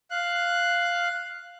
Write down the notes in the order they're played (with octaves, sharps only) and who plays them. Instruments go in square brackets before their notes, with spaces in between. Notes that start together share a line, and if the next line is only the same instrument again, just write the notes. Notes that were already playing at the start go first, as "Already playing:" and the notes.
[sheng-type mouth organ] F5 F#6